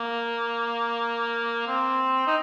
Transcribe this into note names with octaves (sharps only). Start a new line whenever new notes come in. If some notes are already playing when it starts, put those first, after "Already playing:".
Already playing: A#3
C4
D#4